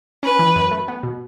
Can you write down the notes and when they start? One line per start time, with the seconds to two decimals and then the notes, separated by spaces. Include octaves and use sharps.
0.23 C#4 B4
0.39 E3
0.56 F#2
0.71 A3
0.88 B3
1.03 B2